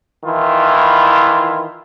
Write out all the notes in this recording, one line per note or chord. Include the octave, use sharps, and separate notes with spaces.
D#3 E3 E4 F4